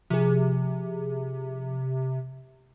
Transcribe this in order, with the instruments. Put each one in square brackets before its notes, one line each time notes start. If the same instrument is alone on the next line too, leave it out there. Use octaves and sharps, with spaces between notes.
[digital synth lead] C3 [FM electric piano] F3 G#4